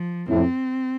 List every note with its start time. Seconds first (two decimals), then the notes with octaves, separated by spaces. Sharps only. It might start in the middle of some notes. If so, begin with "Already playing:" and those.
Already playing: F3
0.29 F2 A2 C4